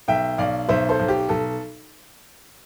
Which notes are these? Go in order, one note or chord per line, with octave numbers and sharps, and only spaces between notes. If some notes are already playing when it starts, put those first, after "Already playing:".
B1 E5 G5
B1 D5 F5
B1 C5 E5
A4 C5
B1
G4
B1 A4